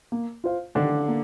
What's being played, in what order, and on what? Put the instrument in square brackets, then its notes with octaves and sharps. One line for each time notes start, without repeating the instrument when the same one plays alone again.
[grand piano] A#3
F4 C5 F5
[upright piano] D3 D4 [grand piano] D#3
[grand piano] A#3